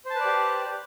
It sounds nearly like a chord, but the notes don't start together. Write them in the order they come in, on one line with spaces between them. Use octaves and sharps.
C5 A5 B4 D5 G4